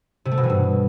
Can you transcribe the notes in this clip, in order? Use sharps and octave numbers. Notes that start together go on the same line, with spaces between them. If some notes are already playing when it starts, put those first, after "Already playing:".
C3
A3
B2
E3
G2